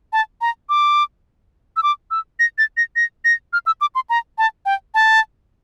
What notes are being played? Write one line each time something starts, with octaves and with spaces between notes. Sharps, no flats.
A5
A#5
D6
E6
D6
E6
A#6
A6
A#6
A#6
A#6
F6
E6
D6
C6
A#5
A5
G5
A5